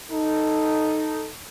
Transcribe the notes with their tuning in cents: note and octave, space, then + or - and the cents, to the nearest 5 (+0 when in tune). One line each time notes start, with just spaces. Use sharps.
D#4 +0 A4 +0